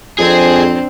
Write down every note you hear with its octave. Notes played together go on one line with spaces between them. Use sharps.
F2 C4 D4 G#4